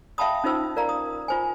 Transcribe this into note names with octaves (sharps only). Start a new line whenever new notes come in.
E5 F5 G5 A5 B5 D#6
C#4 D#4 F4 C5 E6
A#4 D5 F5 A#5
D#6
F4 C5 G#5